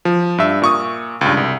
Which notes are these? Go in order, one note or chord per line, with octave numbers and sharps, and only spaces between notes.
F3
G2 E5
A#2 C#6 D#6
C#2 G2
C2